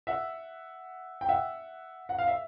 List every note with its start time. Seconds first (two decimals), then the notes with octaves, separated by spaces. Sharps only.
0.07 E5 F#5
1.21 G5
1.29 E5 F#5
2.09 F#5
2.19 F5
2.28 E5